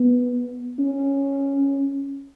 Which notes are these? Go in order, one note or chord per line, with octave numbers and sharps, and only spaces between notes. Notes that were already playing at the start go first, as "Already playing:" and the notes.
Already playing: B3
C#4